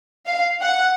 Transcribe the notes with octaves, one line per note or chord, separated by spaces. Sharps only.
F5
F#5